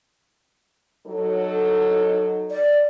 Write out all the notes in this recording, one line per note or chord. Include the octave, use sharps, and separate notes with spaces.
F#3 D#4 A4
D5